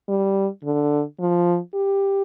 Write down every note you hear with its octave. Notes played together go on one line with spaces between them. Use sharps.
G3
D3
F3
G4